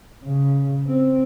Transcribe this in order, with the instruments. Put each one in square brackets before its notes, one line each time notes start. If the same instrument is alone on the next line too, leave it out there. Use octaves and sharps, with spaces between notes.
[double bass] C#3
C4